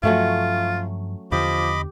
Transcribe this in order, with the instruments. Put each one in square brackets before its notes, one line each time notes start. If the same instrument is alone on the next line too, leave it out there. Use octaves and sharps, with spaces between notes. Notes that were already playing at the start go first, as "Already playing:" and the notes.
[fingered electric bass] G2 F3 [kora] F#3 A3 C#4 [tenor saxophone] F4
[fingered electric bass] E2 D3 [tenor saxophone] F3 [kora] G4 [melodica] D#5 B5 D6